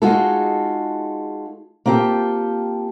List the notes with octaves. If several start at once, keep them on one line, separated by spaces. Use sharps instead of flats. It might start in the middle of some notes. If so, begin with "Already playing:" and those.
G#3 D#4 F4 F#4 G#4 A4
A#3 C4 F4 G4 A4